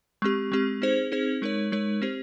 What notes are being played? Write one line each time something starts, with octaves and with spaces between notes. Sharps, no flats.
G#3 C4 G4
G#3 C4 G4
C4 D#4 G#4 C5
C4 D#4 G#4 C5
G#3 D#4 A#4 C#5
G#3 D#4 A#4 C#5
C4 G4 C5